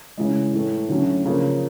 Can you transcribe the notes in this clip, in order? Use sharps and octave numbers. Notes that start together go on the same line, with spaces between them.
C#3 E3 G#3
A2 E3 A3
D3 F#3 A3 C#4 E4
C#3 F3 A#3